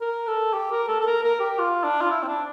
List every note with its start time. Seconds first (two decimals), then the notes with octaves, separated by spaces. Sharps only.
0.01 A#4
0.27 A4
0.53 G4
0.72 A#4
0.88 A4
1.00 A4
1.06 A#4
1.23 A#4
1.40 G4
1.59 F4
1.84 D4
2.01 F4
2.11 E4
2.23 C4
2.28 D4